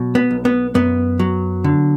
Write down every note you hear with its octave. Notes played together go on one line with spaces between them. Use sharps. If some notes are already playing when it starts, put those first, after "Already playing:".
Already playing: B2 F#3
B3
B1
B3
F#2 B3
F#3
D3